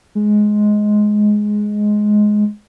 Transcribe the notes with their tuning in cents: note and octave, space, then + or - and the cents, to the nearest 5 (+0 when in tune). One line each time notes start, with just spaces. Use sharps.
G#3 +10